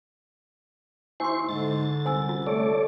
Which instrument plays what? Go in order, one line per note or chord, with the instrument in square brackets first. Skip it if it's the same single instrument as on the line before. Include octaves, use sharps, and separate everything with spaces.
[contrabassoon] D#2 [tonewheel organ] E4 C5 C#6 [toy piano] G#5 C6
[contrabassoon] G#2 [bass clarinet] D3 [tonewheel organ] A6
[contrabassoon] C2 [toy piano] C5 G#5 E6
[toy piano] C#4 F4
[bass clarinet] A3 [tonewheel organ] A4 C#5 D5